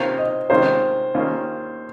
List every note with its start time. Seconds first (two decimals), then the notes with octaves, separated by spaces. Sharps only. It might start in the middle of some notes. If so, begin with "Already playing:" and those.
Already playing: C3 D#3 A#3 C#4 F4 C5
0.18 D#5
0.50 C3 D#3 G#3 C#4 F4 C5
1.14 D#2 D#3 A#3 C#4 F4